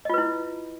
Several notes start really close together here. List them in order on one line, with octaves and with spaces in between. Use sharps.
D#5 F4 B4 E4